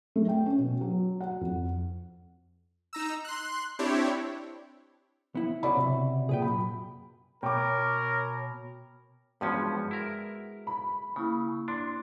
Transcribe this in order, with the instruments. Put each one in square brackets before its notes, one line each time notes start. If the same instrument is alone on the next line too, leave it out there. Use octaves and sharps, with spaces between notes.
[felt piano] A3
G5
C#4
B2
F#3
F#5
F2
[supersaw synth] D#4 A#5 E6
C6 F#6
C4 D4 E4 G4 C#5
[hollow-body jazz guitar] B3 E4
[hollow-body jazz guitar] C#3 F#4 [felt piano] C#5 D5 B5
[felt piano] C3
[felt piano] A#2 [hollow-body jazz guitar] G#4 B4 G5
[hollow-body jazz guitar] F#2 [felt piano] B5
[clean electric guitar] B2 [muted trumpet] A#4 [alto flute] C#5 [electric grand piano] G5 D6
[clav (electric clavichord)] G2 F3 C#4 [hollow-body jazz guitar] G#3 B3 [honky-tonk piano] F#4
[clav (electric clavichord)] E4 A#4
[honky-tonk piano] B5
[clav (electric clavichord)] C#3 [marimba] A#3 E4
[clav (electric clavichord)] D4 [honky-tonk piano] C6